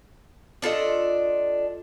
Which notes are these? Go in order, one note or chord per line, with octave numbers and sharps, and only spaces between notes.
D4 F4 A4 D#5